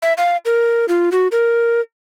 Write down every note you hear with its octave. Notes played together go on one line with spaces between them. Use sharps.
E5
F5
A#4
F4
F#4
A#4